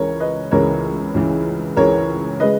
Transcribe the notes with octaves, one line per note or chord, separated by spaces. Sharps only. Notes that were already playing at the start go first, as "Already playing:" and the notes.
Already playing: C#2 C#3 E3 A#4 C#5
B4 D#5
C#2 C#3 E3 A#4 C#5
C#2 C#3 E3
C#2 C#3 E3 A#4 C#5
C#3 G#3 B4 D#5